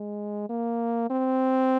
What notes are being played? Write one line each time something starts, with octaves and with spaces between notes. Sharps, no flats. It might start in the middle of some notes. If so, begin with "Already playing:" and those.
Already playing: G#3
A#3
C4